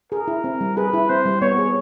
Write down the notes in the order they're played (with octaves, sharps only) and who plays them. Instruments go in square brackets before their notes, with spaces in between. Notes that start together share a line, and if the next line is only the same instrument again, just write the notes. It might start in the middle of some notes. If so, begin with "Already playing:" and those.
[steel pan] G#4 [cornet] A#4
[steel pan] E4
C4
G3
[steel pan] G#4 [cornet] B4
[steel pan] E4
[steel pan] C4 [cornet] C5
[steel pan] G3
[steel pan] B3 [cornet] C#5
[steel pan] G#4